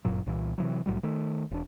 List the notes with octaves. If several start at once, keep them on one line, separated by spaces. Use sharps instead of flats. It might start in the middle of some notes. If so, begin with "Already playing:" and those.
G1 F#2 A#2 F#3
C2 A#2 E3
C3 E3 F#3
C2 A2 F#3 G3
D#3 A3
E1 D4